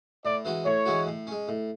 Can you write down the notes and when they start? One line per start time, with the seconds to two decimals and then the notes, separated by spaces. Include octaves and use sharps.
0.25 A2 D5
0.45 E3 G#3 C#4 F#4
0.65 A2 C#5
0.85 E3 G#3 C#4 F#4
1.07 A2
1.27 G#3 C#4
1.48 A2